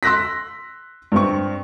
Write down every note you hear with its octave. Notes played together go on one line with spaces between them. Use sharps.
C6 E6 F#6 A#6 B6
G2 C4 C#6